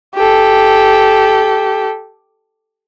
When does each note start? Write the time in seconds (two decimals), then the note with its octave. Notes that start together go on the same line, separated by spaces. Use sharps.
0.15 G4 A4